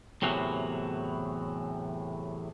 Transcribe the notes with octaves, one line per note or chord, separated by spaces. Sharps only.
E2 A2 C3 E3 F#3